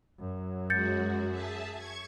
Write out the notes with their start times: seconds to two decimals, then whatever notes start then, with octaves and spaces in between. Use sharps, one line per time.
0.20 F#2 F#3
0.70 G#3 F#4 G6 A6 C#7
1.28 G#4 E5 A5
1.72 C#6 G#6